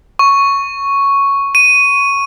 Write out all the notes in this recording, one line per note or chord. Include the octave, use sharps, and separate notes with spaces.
C#6
D#7